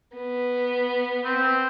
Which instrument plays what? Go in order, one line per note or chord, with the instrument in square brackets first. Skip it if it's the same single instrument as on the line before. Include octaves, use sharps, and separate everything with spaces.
[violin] B3
[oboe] C4